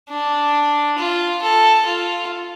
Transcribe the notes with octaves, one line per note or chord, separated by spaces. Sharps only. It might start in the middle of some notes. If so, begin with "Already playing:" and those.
D4
F4
A4
F4